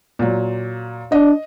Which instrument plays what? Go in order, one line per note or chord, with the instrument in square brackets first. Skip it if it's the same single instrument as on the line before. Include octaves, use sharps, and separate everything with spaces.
[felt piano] A#2 F#3
[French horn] D4 [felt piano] D#5